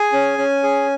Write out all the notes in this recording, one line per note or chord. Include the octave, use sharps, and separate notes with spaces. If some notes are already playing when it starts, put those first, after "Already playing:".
Already playing: G#4 G#5
C#4
C#4
G#4